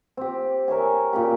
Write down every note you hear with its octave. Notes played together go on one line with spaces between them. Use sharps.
C4 G4
A#4 C#5 E5 G#5
A#2 C#3 G4